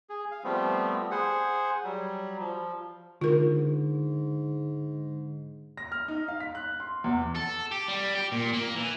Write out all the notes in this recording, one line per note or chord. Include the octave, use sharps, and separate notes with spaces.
G#4
F5
F3 G3 A3 B3 C4
G#4 C5 F#5
F#3 G3
F3
G#2 D3 F4 A#4
A#6
F6
D#4
F5
B6
F#6
C6
E2
A4
G4
G3
G4
A#2
A#3
E3